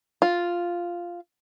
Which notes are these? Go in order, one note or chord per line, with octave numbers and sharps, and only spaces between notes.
F4